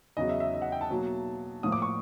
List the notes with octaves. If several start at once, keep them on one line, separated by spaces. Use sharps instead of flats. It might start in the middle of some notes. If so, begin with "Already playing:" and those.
E2 C#3 F#3 D#5
E5
E5
D#5
F#5
G5
A5
B2 F#3 A#3
A2 F3 A#3 D#6
D6
C#6